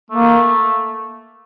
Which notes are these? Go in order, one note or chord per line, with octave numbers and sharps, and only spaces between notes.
A3 A#3